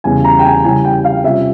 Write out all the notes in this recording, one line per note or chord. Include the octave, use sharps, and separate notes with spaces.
E2 C#3 G3 G#5
A#5
G5
G#5
C#3 E3 G3 G#5
G5
F5
C3 G3 C#4 F4 E5